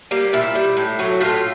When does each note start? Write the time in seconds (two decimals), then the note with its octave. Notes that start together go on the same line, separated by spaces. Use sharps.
0.11 G3 A#3
0.33 A#2 E4
0.55 G3
0.77 A2
0.99 F#3 A3
1.20 A2 F4